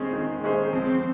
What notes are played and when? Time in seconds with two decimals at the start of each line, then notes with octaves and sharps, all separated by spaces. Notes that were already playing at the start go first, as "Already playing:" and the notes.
Already playing: D#3 G#3 C4 C#4 G#4 C5
0.13 D#3
0.44 G#3 C#4 G#4 C5
0.73 F3 C4